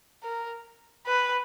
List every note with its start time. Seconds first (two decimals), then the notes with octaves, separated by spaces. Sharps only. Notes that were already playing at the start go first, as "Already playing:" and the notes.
0.24 A#4
1.07 B4